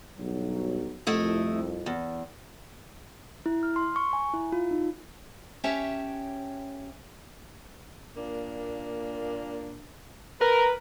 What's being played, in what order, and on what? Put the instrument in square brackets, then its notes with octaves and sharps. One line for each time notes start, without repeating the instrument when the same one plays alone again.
[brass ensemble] B1 G2 F#3
[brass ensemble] C2 F2 [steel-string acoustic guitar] A3 E4 D#5
[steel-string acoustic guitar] E2
[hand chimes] E4
F6
C6
C#6
G#5
E4
F4
D#4
[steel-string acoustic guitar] C#4 G4 C#5 E5 G5 A5
[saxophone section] A#2 A#3 D4
[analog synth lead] A#4 [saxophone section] B4